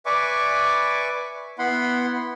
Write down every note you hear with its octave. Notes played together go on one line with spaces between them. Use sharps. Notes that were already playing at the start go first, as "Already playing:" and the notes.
B4 D5 E5 G#5 C#6 D6
B3 E4 F#5 B5 C6